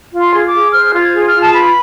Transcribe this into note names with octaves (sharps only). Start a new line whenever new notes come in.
F4
C6
G#4
D6
G#4
C5 F6
F4
G#6
G#4
F6
F4
A5
B4 B5